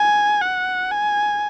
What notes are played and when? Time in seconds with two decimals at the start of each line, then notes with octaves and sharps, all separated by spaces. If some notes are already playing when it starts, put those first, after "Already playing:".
Already playing: G#5
0.42 F#5
0.91 G#5